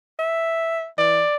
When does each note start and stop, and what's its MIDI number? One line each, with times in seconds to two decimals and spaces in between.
0.19 0.87 76
0.98 1.22 52
0.98 1.37 74